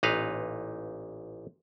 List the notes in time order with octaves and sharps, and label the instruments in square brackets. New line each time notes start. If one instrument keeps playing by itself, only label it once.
[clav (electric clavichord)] A1 A#2 D#4 B4 F5